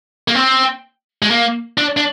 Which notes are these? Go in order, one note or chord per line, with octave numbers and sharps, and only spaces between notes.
A#3
C4
G#3
A#3
D4
D4